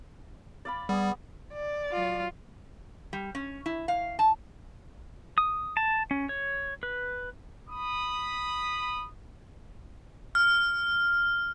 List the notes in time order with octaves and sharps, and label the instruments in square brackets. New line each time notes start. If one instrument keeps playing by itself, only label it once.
[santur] D5 F5 B5
[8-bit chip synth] G3 [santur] B3 G#4 G#5
[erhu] D5
[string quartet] F#3 F4
[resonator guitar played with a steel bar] G3
C#4
E4
F5
A5
[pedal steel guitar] D#6
A5
C#4
C#5
B4
[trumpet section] B5 D#6
[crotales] F6